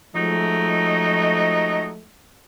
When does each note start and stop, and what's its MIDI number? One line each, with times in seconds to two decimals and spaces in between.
0.15 2.03 53
0.15 1.88 54
0.15 2.03 56
0.15 2.03 57
0.15 1.88 63